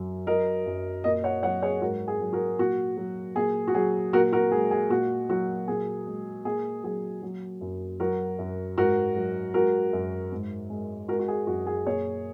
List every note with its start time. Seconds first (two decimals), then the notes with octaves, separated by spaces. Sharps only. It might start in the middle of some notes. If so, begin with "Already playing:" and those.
Already playing: F#2 F#3
0.27 F#3 A#4 D#5
0.66 F#2
1.04 A#2 A#4 D#5
1.24 C#5 F#5
1.43 F#3 C#5 F#5
1.62 G#4 C#5
1.82 G#2 F#4 A#4
2.08 G#4
2.21 F#3
2.33 F#4 A#4
2.59 A#2 F#4
2.97 F#3
3.36 A#2 G#4
3.68 F#4
3.74 F#3 G#4
4.13 A#2 F#4 A#4
4.33 F#4 A#4
4.52 G#3 G#4
4.71 G#4
4.90 A#2 F#4
5.29 F#3 F#4
5.68 A#2 G#4
6.07 G#3
6.45 A#2 G#4
6.84 F#3 G#4
7.22 F#3
7.61 F#2
8.00 F#3 F#4 A#4
8.39 F#2
8.77 G#2 F#4 A#4
9.16 F#3
9.54 G#3 F#4 A#4
9.93 F#2
10.32 G#2
10.70 G#3
11.08 G#3 F#4 A#4
11.19 F#4
11.28 G#4
11.47 F#2 F#4
11.67 G#4
11.86 A#2 G#4 C#5